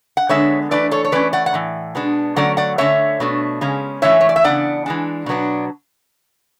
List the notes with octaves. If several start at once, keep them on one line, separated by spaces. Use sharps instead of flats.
F#5
D3 G#3 B3 D4 C#5 E5
E3 A3 D4 B4 D5
A4 C#5
C#5
E3 A3 C#4 B4 D5
D5 F#5
F#5
A2 E3
B2 G#3 B3 D4
D3 F#3 A3 C#4 D5 F#5
D5 F#5
D3 A3 C#4 C#5 E5
B2 A3 D4
C#3 G#3 C#4
E3 A3 C#4 C#5 E5
C#5
D5
E5
C#3 E3 B3 D4 D5 F#5
E3 G#3 D4
B2 F#3 B3 D4